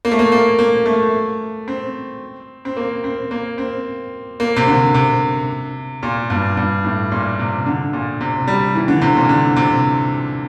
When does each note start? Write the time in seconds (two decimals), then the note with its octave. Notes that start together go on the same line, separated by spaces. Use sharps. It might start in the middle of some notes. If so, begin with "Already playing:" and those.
0.05 A#3
0.11 A3
0.19 A#3
0.32 A#3
0.59 A#3
0.86 A3
1.68 C4
2.65 C4
2.77 A#3
3.04 C4
3.31 A#3
3.58 C4
4.40 A#3
4.56 C3
4.67 D3
4.94 C3
6.03 A#2
6.30 G2
6.57 G2
6.84 A2
7.12 A#2
7.39 C3
7.66 D3
7.93 A#2
8.21 C3
8.48 G3
8.75 E3
8.88 D3
9.01 C3
9.16 A#2
9.29 D3
9.56 C3